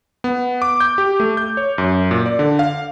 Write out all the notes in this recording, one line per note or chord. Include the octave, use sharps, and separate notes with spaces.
B3
D6
G6
G4
A3
G6
C#5
F#2
A#2
D5
D3
F5